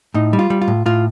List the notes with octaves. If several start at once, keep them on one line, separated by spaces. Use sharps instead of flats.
A2 D#4
G3
F4
G3
F4
A2
A2 F4